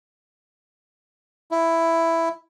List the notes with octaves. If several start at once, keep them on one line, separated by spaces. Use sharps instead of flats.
E4